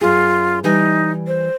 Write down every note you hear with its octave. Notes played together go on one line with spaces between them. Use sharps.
F#2 F4 G#4
E3 G3 D#4 G#5
C5